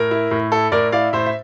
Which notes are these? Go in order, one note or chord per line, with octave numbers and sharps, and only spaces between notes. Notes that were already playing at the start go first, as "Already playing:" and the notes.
Already playing: A2 A#4
E4
A2
E4 A4
A2 A#4 D5
E4 D5 F5
A2 C5 E5
E5